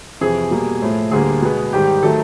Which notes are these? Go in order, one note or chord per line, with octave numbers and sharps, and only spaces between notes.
F2 C3 E3 G#4
B2 G3 A#3
A2 F3 A3
D2 D3 G3 A#3 G#4
B2 G#3 B3
G#2 D#3 G3 G4
D#3 F#3 A3 A4